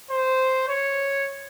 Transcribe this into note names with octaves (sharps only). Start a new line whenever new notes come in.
C5
C#5